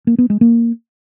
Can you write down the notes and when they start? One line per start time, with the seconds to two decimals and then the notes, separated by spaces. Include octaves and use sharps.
0.07 A#3
0.18 B3
0.30 G#3
0.41 A#3